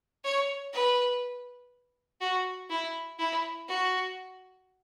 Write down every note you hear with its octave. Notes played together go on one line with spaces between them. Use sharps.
C#5
B4
F#4
E4
E4
F#4